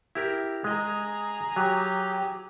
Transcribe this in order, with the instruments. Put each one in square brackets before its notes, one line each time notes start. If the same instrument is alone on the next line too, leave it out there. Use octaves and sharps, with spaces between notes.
[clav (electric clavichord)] E4 G4 A#4
[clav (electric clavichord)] G#3 D#5 [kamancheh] G#4 A#5
[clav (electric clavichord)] F#3 [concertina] G4